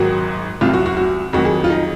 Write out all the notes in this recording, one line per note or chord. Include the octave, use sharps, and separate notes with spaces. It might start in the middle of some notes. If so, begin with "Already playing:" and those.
Already playing: G#1 G#2 D#3 F#3 F#4
C2 C3 F#3 F4
F#4
F#4
F#4
F2 D#3 F#3 F#4
G#4
F4
D#4